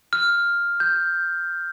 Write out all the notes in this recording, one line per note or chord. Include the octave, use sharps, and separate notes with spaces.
F6
G6